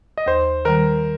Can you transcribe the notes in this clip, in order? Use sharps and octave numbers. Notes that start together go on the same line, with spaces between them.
D#5
D#2 C5
D#3 G3 A#4